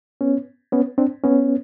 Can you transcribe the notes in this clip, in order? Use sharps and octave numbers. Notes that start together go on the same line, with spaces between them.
B3 C#4
B3 C#4
C4 D4
B3 C#4